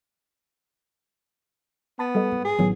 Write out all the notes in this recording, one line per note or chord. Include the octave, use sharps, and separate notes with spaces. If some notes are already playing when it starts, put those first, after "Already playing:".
B3 A5 B5 A6
G3 A4 D#5
G#2
G#4
A1 D#3 F#3 B3